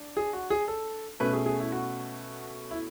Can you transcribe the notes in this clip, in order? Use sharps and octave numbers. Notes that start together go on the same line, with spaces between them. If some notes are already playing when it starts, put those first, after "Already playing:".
Already playing: D4
G#4
F#4
G#4
A4
B2 A3 C#4 B4
G#4
G#4
E4
F#4
E4